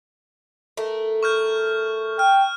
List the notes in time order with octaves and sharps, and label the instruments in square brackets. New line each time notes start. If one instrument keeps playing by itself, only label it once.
[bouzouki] A3 A#4
[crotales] C#6 F6 G6
[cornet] G5 [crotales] F6